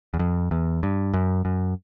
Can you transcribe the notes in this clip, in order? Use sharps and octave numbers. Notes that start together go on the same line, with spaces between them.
E2
F2
E2
G2
F#2
F#2